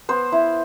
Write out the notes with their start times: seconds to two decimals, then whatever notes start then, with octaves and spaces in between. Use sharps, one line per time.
0.09 B3 C5
0.32 E4